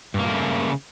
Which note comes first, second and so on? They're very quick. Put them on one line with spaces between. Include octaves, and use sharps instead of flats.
G2 A#3 A#2 A3 C#3